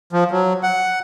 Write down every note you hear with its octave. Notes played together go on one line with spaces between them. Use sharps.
F3
F#3
F#5